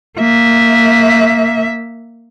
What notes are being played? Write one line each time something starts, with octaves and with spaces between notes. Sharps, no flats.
A#3 E5